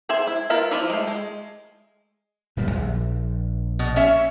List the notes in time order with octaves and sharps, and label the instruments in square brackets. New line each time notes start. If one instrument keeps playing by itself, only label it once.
[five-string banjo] C4 G#4 C5 E5 G#5
E4
B3 E4 F4 A#4
F3 E4 F4 D5 E5
G#3 A3
G#3
[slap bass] D1 A#2 G3
A#1
[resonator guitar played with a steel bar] B2
C#4 E5